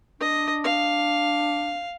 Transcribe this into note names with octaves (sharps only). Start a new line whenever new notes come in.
D4 D#5
F5